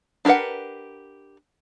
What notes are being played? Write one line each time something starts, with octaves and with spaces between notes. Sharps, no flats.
D4 G4 A#4 B4 F#5